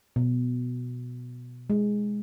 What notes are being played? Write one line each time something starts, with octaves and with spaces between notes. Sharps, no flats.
B2
G#3